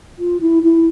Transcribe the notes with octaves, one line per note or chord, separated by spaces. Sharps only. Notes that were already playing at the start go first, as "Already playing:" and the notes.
F4
E4
E4